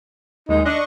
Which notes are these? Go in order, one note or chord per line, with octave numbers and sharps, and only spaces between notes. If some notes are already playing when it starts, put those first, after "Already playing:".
D#2 G#3 D#4
D4 D#5 C#6